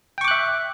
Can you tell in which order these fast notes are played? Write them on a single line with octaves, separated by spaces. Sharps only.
G5 C#6 D6 F#6 E5